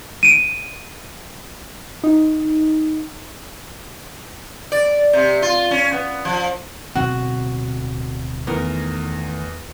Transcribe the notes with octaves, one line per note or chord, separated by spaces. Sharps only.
D7 D#7
D#4
D5
C3
F4
C#4
B3
F3
D1 B2 C4 F#4
E2 D#3 A3 A#4